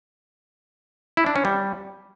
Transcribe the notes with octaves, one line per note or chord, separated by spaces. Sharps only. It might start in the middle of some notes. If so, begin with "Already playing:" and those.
E4
D4
C#4
G3